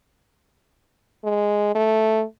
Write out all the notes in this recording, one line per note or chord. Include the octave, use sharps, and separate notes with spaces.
G#3
A3